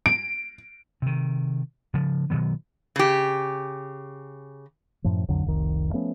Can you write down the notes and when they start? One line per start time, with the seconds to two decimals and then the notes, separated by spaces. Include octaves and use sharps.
0.06 D7
1.02 C3 D#3
1.94 C#3 F3
2.30 B2 D#3 F#3 B3
2.96 C#3 G4
5.04 F#2 A2 F3
5.29 B1 F2 D3 F#3
5.45 F1 C2 D#3
5.93 F3 A3 B3 C#4